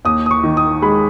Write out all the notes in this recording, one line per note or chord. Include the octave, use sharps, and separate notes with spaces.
D#2 D#6
D#6
C#6
D#3
D#6
G#3 B5